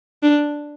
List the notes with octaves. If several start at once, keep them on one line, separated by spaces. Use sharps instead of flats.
D4